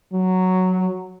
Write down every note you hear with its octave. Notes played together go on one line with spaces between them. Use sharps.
F#3